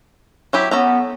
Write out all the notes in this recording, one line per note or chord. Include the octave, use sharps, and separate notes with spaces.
F#3 E4 G4
B3 C#4 A4 A#5